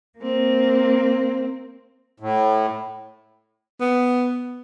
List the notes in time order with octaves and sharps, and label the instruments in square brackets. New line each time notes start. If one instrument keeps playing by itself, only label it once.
[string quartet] A#3 C4
[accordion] A2
[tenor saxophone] B3